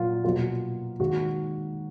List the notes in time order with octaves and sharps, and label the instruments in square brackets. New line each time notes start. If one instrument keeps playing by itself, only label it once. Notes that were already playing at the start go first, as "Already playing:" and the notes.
Already playing: [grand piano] A#2 F#3 A#3 F4
B2 F#3 A#3 F4
G#2 D#3 A#3 F#4